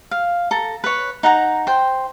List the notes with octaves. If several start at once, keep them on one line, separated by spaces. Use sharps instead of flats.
F5
A4 A#5
B4 C#5
D#4 F#5 A#5
C5 G5